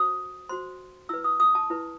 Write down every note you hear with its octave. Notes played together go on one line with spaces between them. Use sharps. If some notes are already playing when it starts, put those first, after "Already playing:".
Already playing: F#4 C5 D#6
F#4 C5 C6
E4 B4 E6
D#6
D#6
A5
E4 B4